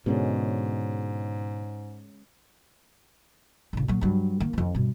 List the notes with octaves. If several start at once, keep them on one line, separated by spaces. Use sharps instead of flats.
G#2 B2 D3 G#3 C#4
A1 C#3
A#2 F#3
G2 F#3
D#3 A#3
F2 E3
G2 B2